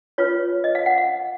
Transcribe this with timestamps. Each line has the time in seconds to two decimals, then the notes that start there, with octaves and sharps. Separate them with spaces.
0.18 F4 B4 C#5
0.64 D#5
0.75 F5
0.86 F#5
0.98 F5